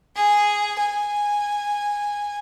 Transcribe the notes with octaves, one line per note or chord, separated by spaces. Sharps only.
G#4
G#5